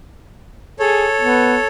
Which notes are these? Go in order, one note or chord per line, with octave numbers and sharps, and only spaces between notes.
G#4 A4 C#5
B3